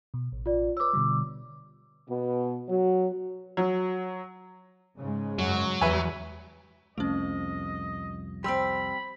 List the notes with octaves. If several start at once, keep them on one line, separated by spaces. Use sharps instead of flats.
B2
A1
F4 D5
B4 C#5 D6 E6
B2 D3 G3
B2
F#3
F#3
G#2 C#3 G#3
F#2 F#3
E2 B4 E5 G#5
C2 F2 A3 C#4 D#5
G3 C4 B5 C6 E6